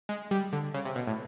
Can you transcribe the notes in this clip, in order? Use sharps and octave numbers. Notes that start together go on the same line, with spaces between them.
G#3
G3
D3
C#3
C3
B2
A2